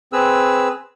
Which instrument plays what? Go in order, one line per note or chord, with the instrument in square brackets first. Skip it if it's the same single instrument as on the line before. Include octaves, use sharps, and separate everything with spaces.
[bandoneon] C4 G#4 B4 E6